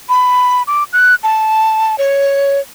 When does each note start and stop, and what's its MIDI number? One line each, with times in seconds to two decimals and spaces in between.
0.09 0.63 83
0.67 0.84 86
0.93 1.15 90
1.23 1.98 81
1.98 2.60 73